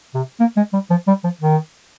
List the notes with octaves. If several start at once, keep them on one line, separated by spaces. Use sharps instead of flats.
C3
A#3
G#3
G3
F3
G3
F3
D#3